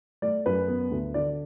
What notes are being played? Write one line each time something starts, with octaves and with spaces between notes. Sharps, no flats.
A3 D5
F#2 B4
B3
D2
D3 D5